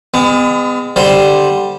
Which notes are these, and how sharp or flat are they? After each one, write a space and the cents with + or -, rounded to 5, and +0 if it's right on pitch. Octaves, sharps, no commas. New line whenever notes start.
G#3 -35 B3 +35
D3 +0 G3 +0 C5 +0